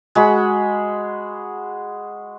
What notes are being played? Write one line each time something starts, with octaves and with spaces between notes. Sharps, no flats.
G#3 F#4 B5